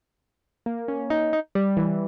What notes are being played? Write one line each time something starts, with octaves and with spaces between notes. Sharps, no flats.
A#3
C#4
D#4
D#4
G3
E3